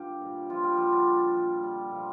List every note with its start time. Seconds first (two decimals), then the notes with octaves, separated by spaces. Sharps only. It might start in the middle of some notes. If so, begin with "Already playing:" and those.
Already playing: G2 D3 F4 G4
0.21 A#2 G3
0.50 F3 F4
0.63 G3 G4
0.77 G2 D3 F3 G3 F4
0.92 D3 D4
1.35 A#2 G3
1.63 G3
1.91 A#2 F3